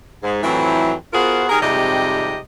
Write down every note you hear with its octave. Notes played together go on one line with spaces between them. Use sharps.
G#2
F2 A2 E3 F#3 C4 E4
B3 F4 F#4 G#4 A#4 C5
D#3 G3 G#4 A#4
F2 G#2 C3 G3 G4 D#5